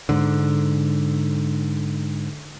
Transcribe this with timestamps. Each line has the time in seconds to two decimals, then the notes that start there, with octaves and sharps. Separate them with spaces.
0.09 G#2 D3